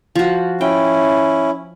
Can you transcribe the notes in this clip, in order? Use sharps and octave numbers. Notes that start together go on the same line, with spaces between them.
F3 F#4
C#4 E4 G5